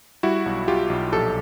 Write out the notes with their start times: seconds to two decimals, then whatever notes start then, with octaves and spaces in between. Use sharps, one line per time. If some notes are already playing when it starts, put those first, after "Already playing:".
0.23 G3 E4 F#4
0.46 B1
0.68 B1 F4 G4
0.90 B1
1.12 A#1 G4 A4